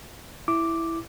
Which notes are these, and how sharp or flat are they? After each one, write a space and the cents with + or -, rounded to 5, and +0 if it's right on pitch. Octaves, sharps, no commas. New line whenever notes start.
E4 +0 D6 +0